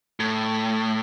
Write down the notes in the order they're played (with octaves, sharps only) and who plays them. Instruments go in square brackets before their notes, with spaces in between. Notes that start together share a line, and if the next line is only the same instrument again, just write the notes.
[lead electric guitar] A2